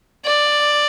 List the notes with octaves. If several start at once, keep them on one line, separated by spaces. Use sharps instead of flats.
D5